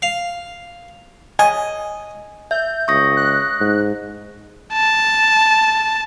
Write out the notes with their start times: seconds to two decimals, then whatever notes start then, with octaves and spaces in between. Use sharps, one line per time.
0.02 F5
1.39 D#5 G#5
2.51 E5 G6
2.88 C#2 C#6 D#6 A#6
3.17 F#6
3.60 G#2
4.73 A5